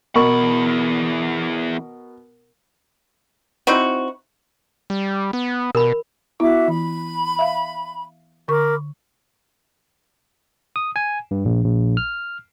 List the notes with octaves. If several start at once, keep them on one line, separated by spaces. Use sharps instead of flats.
E2 B2 A#4 B5 C#6
C4 D#4 E4 F#4
G3
B3
B2 A#4 B5
B3 E4 F#4 E5 D6
E3 B5
E5 F5
D3 A#4 B5 C#6 D6
D#6
G#5
G2
A#1
A#1
F6